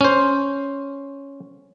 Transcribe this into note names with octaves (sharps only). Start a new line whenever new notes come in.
C#4 C5